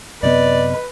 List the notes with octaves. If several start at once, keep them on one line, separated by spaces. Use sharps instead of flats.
F#2 C3 B3 B4 D5 D#5